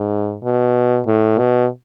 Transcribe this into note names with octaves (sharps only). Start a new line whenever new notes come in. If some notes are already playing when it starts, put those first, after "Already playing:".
Already playing: G#2
B2
A2
B2